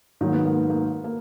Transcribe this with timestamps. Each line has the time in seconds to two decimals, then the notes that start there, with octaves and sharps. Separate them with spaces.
0.21 G#2 D#3 F#3 A#3
0.33 B3
0.46 A#3
0.57 B3
0.69 A#3
1.04 A#3